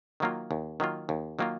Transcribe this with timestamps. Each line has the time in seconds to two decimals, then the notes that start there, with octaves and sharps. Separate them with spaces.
0.20 D#3 F#3 A#3 F4
0.51 D#2
0.80 D#3 F#3 A#3 F4
1.09 D#2
1.39 D#3 F#3 A#3 F4